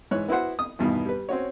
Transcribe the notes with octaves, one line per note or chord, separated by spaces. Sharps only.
G#2 E3 C#5 F#6
B3 E4 F#4 C5 F#5
D#6
E2 G2 B2 D#3
G3 B4
C4 C#4 F#4 C#5